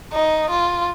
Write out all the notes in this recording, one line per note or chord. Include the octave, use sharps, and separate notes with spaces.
D#4
F4